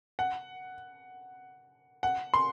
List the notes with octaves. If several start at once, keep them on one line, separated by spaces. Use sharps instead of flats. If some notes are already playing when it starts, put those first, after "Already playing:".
F#5
F#5
C6